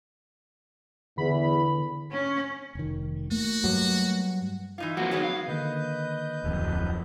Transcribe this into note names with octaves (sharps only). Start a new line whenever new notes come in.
E2 D3 B5
C#4
F1 D#3
A3 A#3 F#4
G2 F#3
E3 D#4 F4
F3 A#3 C4 F#4
D#3 F#3 B3 C#4 D#4 G#4
F5
D3 D#3 A#3 B4 D#5 G6
D1 F2